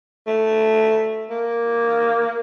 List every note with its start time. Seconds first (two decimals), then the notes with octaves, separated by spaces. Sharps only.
0.27 A3
1.31 A#3